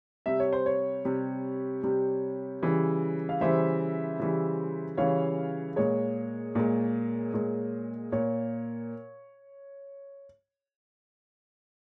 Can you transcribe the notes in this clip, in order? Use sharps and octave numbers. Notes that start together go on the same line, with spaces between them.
C3 G3 E5
C#5
C5
C#5
C3 G3
C3 G3
C#3 E3 G3
F5
C#3 E3 G3 C5 E5
C#3 E3 G3
C#3 E3 G3 C#5 F5
A#2 G#3 C#5
A#2 G#3
A#2 G#3
A#2 C#5